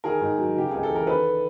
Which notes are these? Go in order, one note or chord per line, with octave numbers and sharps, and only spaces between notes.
D#3 G#4 A#4
G#2
F#3
C#3 G4
C#2 G#4
A4
E3
A#4
D#3 A4 B4